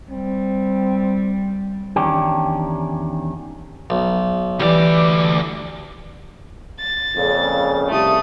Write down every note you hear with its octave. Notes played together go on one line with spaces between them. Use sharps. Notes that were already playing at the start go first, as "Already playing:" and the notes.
G3 C4
E2 D#3 C#4 D4 G4
B1
D2 E3 G3 D5
A6
F2 A#2 C#3
C2 A3 D#6